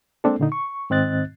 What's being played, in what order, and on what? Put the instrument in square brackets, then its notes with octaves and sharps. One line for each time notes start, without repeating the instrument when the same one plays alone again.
[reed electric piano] G#3 A#3 C4 D4 A4
A#2 D3 D#4
C#6
G#2 D#3 C4 D#5 F#6 A6